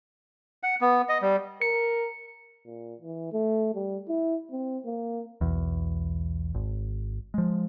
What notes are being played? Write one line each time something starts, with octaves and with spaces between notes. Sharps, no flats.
F#5
B3
D#5
G3
A#4 C#7
A#2
E3
A3
G3
E4
C4
A#3
B1 E2
G#1
F3 G#3